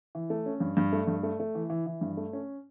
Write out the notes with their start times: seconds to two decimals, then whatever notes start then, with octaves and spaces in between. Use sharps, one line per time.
0.15 E3
0.30 A3
0.46 C#4
0.60 G2
0.77 G2
0.93 A3
1.07 G2
1.23 A3
1.40 A3
1.55 E3
1.70 E3
1.86 E3
2.01 G2
2.17 A3
2.33 C#4